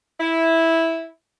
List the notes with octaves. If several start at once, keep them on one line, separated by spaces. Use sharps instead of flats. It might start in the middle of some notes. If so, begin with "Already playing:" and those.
E4